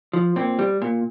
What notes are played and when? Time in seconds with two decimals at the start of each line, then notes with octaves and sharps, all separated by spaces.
0.13 F3
0.36 A#2 C4
0.59 G3
0.82 A#2